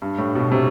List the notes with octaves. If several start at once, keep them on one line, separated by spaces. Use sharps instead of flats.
G2
A2
B2
C3